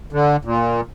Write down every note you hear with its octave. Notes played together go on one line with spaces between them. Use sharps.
D3
A#2